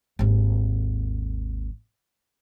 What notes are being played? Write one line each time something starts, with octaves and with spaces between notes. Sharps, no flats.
G#1 D#2